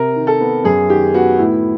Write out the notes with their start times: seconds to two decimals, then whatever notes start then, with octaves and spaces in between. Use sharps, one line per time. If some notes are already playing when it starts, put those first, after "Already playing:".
Already playing: C3 A#4
0.16 D#3
0.27 A4
0.41 B3
0.64 F#2 G#4
0.89 D#3 G4
1.14 B3 F#4
1.38 A2 E4